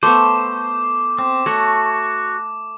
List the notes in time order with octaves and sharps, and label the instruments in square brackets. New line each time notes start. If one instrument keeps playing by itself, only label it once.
[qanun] A3 B3 [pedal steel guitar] C5 [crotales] D6
[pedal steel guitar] C4 [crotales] D6
[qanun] A3 [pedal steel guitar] F#4 C#5